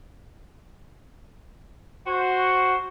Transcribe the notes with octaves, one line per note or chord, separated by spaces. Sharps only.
F#4 C5